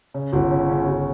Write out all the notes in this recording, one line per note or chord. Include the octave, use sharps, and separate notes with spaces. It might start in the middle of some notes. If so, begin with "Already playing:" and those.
C#3
G1
C#3
C#3
G1